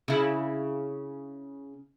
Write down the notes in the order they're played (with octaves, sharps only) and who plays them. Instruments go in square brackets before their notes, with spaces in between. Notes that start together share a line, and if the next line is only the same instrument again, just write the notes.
[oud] C#3 E4